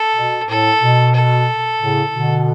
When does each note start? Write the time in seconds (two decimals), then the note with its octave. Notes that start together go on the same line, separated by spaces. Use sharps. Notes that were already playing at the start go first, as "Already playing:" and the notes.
Already playing: A4
0.16 B2
0.48 A2 A4
0.81 B2
1.14 A4
1.80 A2 C#3
2.13 B2 D3